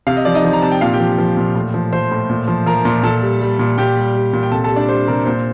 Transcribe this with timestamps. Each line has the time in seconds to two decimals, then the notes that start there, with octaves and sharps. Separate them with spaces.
0.07 C3 F5
0.17 D#5
0.25 F3 D5
0.35 D#4 D#5
0.44 F3
0.53 A#5
0.62 C3 A5
0.71 G5
0.81 A#2 F4 F5
0.93 G4 G5
1.00 F3
1.18 F3
1.37 A#2
1.55 A2
1.74 F3
1.93 F3 C5 C6
2.11 A2
2.30 A#2
2.48 F3
2.66 F3 A#4 A#5
2.85 A#2
3.03 A#2 A4 A5
3.22 G3
3.41 G3
3.59 A#2
3.78 A#2 G4 G5
3.97 G3
4.15 G3
4.33 A#2
4.43 G5
4.51 C3 A4 A5
4.64 A4 A5
4.70 G3
4.76 D4 D5
4.88 G3 C5
5.07 C3 A#4
5.26 A#2 C5